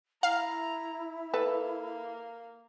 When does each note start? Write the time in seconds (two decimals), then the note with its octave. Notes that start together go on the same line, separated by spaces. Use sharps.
0.23 E4 F5 A#5
1.34 A#3 A4 B4